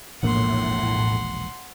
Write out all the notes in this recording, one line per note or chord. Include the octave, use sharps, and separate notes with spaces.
E1 A#1 A2 A#3 F#5 C6